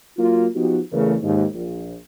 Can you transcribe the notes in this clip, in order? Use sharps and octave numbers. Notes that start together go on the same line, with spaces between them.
F#3 A#3 F4
F3 B3 D#4 F#4 G4
E2 C#3 E3 A3 A#4
D#2 G#2
A#1